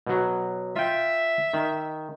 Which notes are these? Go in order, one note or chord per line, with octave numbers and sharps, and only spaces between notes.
B2 F#3
F4 E5 G5
D#3